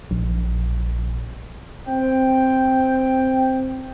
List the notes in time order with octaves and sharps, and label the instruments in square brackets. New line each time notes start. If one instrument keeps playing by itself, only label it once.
[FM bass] A#1
[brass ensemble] C4 G5